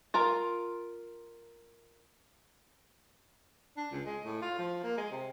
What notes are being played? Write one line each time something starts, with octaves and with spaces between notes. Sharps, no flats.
F4 A#4 A#5
D4
C#2
G#3
A2
F4
F3
A#3
G#3
C3